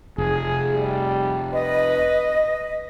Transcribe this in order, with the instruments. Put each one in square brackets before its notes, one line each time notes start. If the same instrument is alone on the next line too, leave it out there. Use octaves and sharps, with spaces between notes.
[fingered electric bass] F1 [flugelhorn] G#4
[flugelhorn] G3
[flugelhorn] B4 [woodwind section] D#5